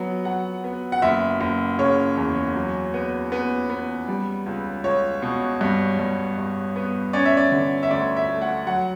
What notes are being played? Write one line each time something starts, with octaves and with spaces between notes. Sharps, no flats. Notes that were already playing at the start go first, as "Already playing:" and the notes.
Already playing: F#3 B3
F#3 F#5
B3
F#5
F#1 E5
F#1
C#3 C#5
E2
F#3
B3
B3
B3
G3
C#2
C#2 C#5
B2
G2
G2
G2
B3
C#4 D5
E5
D5
D3
E5
D2 D5
E5
A3
F#5
F#3 F#5